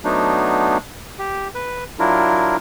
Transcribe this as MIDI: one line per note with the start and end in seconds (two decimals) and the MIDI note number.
0.04 0.77 54
0.04 0.77 57
0.04 0.77 59
0.04 0.77 62
0.04 0.77 63
1.19 1.48 67
1.55 1.84 71
1.99 2.56 54
1.99 2.56 62
1.99 2.56 64
1.99 2.56 65
1.99 2.56 70